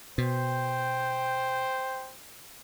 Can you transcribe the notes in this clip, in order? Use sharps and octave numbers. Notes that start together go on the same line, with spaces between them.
B2 C5 G5